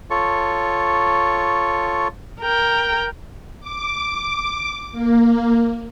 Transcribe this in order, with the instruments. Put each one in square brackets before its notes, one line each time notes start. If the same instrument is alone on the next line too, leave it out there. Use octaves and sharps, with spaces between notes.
[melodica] F4 A4 C#5 C#6
[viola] A#4 G5
[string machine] D6
A#3